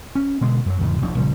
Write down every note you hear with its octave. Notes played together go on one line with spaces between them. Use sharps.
C#4
B2 D3 G#3
F#2 F#3
E2 G#2 C#3 G#3
F#1 B1 F3 D4
A#1 C#3 F3 G3